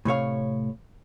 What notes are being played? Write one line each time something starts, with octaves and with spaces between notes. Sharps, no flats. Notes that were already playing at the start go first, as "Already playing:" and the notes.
A2 C3 C#5 F5